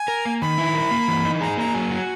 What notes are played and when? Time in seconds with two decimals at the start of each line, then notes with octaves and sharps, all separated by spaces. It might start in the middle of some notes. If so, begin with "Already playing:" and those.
Already playing: G#5
0.08 A#4
0.25 A#3
0.42 D#3 B5
0.58 E4
0.75 A#4
0.91 A#3
1.08 E3
1.25 D#4
1.41 G#4 A#5
1.57 A#3 A#5
1.74 F#3 G#5
1.91 F#4